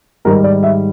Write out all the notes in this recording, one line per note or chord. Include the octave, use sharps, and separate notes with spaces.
G#2 D#3 G3 A#4
D5
E5